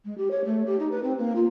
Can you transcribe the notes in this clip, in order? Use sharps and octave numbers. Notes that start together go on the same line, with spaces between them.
G#3
G4
C#5
A3
G4
D#4
B4
C4
A#3
F4